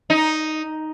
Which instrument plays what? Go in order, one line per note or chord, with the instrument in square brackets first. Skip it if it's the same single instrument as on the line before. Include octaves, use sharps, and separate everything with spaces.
[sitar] D#4